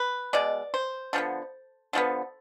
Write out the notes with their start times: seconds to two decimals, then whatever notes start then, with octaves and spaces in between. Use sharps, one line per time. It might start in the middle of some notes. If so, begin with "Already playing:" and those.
Already playing: B4
0.33 B2 G#3 D5
0.74 C5
1.13 D3 F3 G#3 B3
1.93 D3 F3 G#3 B3